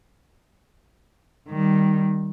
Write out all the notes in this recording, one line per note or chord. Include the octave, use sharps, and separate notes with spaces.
D#3 G3